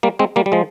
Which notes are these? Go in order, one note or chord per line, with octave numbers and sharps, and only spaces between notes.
G3 A#3
G#3 C4
G3 A#3
G3
F3 G#3